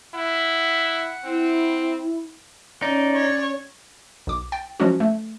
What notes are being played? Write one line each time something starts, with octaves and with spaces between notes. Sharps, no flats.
E4 F#5
C4 E4
C#4 D#4 D5
C#5
B1 D6
G5 A6
F3 F#3 G#3 C#4 F#4
A3